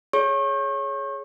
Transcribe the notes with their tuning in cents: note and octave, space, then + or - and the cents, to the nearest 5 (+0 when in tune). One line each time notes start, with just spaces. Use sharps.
G#4 +25 C#5 +0 C#6 -35